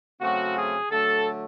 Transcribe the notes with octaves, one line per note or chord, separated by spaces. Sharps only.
C#3 F#3 A3 C4 F#4
G#4
D3 F#3 A3 A4